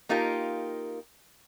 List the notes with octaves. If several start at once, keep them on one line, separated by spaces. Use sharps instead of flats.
A#3 D#4 F4 G4 A#4